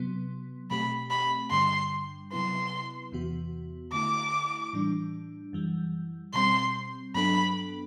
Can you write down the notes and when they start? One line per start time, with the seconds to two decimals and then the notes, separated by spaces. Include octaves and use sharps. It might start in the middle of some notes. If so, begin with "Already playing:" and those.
Already playing: C3 F#3 B3
0.71 B2 A3 C4 G4 B5
1.10 B5
1.51 G2 D3 G3 C6
2.32 C3 F#3 B3 E4 B4 C6
3.12 E2 C3 E3 B3 F#4
3.92 D3 A3 E4 D6
4.73 A2 E3 G3 D4
5.53 F#2 E3 G3
6.34 B2 G3 C4 C6
7.14 G2 F#3 B3 D4 A4 B5